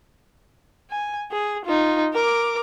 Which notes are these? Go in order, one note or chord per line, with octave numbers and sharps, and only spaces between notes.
G#5
G#4
D#4 F4
A#4 D6